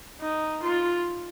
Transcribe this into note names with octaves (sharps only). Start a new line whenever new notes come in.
D#4
F4